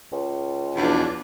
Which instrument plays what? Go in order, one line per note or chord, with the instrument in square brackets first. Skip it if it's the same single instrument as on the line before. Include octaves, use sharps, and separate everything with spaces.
[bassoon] C#2
[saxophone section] E2 B2 F3 [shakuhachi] D4